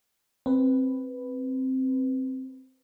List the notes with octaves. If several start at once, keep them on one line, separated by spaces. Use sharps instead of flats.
C4 B4